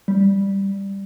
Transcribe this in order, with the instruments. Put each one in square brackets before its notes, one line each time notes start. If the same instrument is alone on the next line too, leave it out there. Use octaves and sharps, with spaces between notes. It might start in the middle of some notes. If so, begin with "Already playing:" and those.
[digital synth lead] G3